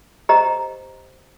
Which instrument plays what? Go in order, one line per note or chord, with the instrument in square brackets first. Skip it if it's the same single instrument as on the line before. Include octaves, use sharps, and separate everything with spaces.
[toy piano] G4 C5 D#5 A#5